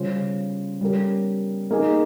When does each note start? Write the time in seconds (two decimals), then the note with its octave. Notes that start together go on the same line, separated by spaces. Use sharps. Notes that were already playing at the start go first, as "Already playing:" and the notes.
Already playing: C#3 G3 C#4 F4 C5
0.81 G3 C#4 G4 A#4
1.71 A#3 D#4 G#4